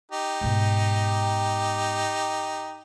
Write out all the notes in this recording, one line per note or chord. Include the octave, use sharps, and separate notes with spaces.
D#4 G4
G#2 B2